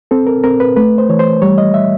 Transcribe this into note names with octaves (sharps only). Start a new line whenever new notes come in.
C4 A4
A#4
C4 A#4
B4
A3 B4
C5
E3 C#5
C5
G3 C#5
D#5
E5